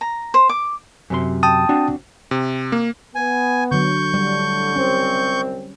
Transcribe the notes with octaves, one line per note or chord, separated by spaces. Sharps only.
A#5
C5
D6
F#2 C3 C6
G5 A5 D#6
C4 D4 F#4
C3
A#3
B3 G#5
D3 F#3 C#6 G6
A2 D3 G3
C2 C4 C#4